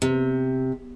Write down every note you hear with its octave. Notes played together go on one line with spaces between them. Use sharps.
C3